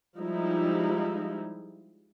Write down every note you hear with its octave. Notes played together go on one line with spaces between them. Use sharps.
F3 G3 G#3 D#4 E4